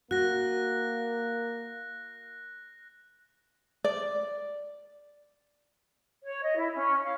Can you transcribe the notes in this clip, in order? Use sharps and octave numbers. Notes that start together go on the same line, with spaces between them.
A#3 F#4 F#6 A#6
D5
C#5
D#5
E4
C#4
F5